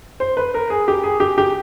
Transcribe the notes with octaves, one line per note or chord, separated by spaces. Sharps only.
C5
B4
A#4
G#4
G4
G#4
G4
G4